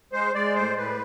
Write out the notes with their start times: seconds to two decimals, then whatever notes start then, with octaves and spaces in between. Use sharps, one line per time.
0.13 G#3 C5
0.35 G#3 D5
0.55 A2 C5
0.77 A2 B4